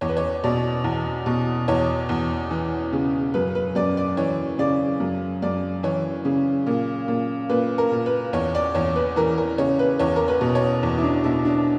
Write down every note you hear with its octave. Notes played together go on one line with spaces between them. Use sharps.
E2 C#5
B4
C#5
B2 D5
E2
B2
E2 C#5
E2
E3
C#3
F#2 B4
B4
F#2 D5
D5
E3 C#5
C#3 D5
F#2
F#2 D5
E3 C#5
C#3
A#2
A#2
A#2 B4
A#4
A#2
B4
E2 C#5
D5
E2 C#5
B4
E3 A#4
A#4
C#3 C#5
B4
E2 C#5
A#4
B4
B2
C#5
E2
E4
D4
B2 E4
D4